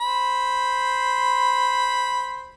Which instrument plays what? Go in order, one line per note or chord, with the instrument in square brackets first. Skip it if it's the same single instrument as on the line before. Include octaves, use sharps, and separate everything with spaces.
[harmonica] C5 B5